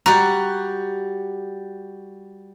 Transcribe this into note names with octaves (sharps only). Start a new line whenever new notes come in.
G3 F#4 A#5